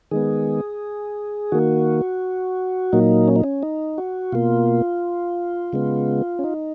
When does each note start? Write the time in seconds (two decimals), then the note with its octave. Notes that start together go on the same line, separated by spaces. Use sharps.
0.11 D#3 G#3 B3 G#4
1.52 D#3 A#3 F#4
2.93 A#2 F#3 A#3 D#4
3.28 C#4
3.36 D#4
3.44 C#4
3.63 D#4
3.98 F#4
4.32 B2 A#3 F4
5.73 C#3 G#3 B3
6.39 C#4
6.44 D#4